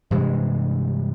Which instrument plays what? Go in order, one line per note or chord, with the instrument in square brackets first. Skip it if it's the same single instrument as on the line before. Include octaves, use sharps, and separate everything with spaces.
[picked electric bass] G2 C3 E3 G#3